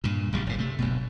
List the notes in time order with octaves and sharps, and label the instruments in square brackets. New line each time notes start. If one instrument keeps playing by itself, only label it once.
[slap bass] G2 A#2
A1 C#3 G3
F#1 A2
C3 A3
F#1 D2 B2